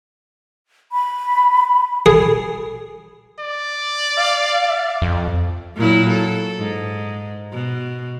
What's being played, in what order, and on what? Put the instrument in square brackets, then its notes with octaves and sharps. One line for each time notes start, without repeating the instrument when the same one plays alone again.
[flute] B5
[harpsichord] G#4 [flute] G#5
[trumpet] D5
[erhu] F5
[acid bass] F2
[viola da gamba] A#2 F#3 E4
A4
G#2
B2